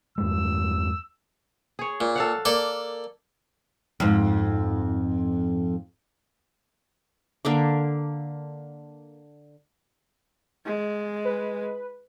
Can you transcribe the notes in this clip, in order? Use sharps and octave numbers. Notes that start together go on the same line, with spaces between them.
E2 G2 G#3 E6
G#4 C#5
A#2
A4 F5 F#5
A#3 A4 D5
F2 G#2
D3 A#3 D6
G#3
B4